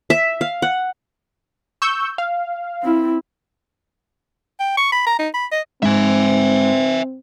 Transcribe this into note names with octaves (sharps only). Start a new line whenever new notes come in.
E5
F5
F#5
C#6 E6 G6
F5
C4 E4
G5
C#6
B5
A#5
D#4
B5
D#5
G#2 C4 E5 G#5